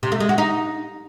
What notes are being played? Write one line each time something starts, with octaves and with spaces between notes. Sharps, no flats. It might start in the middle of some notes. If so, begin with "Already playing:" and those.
C3
A3
G#3
F#4
D#4